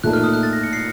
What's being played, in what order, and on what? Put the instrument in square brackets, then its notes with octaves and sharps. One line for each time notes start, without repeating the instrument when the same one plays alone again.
[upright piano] A#2 A3 D#4 A4 [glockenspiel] F#6
[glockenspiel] F6
D#6
F#6
A6
A#6
C#7
C7